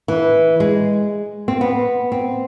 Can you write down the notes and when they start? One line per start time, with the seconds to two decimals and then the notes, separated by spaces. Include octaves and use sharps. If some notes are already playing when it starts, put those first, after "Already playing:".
0.08 E3
0.60 G#3
1.48 C4
1.61 B3
2.12 C4